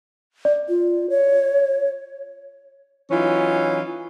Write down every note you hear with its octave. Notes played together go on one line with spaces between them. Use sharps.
D5
F4
C#5
E3 F#3 C#4 D#4 F4